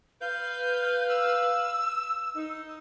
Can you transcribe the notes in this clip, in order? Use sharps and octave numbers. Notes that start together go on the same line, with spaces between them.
B4 F5 G6
E6
D#4